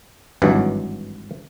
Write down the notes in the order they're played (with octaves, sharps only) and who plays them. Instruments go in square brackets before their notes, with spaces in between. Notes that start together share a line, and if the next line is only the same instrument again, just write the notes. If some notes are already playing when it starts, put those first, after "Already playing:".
[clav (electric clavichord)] G#1 G2 E3 F#3